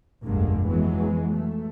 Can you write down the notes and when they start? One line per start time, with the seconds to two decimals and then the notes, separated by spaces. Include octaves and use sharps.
0.24 F1 A#1 G2 D3 G#3 A#3
0.67 F2 E3 F#3 G#3 B3
1.32 A3